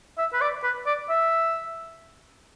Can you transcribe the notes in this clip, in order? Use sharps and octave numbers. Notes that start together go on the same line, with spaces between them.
E5
B4
D5
B4
D5
E5